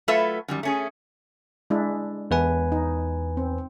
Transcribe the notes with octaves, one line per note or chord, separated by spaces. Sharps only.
F#3 A3 F4 A4 B4 E5
F#2 D#3 G3
A3 C#4 G#4
G#3 D4 E4
E2 B4 G#5
D#4
C4